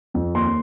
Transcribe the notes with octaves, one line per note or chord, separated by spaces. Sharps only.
F2
D#2 C6